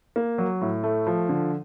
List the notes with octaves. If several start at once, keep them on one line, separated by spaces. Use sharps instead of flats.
A#3
F#3
A2
A3
F3
D3